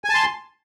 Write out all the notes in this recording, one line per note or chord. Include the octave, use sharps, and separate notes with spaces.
G#5 A5 C6